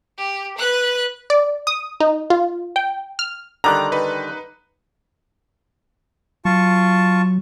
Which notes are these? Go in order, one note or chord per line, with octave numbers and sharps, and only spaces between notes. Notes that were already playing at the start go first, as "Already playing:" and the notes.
G4
B4 F#6
D5
D#6
D#4
F4
G5
F6
D3 D#3 G3 A#5 D6 F#6
D#4 B4
F#3 F4 A5 C#6